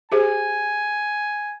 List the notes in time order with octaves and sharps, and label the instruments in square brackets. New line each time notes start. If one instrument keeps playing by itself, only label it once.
[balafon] G4 G#4 C5 [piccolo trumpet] G#5